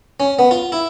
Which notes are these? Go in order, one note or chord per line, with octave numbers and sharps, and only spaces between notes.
C#4
B3
F4
E4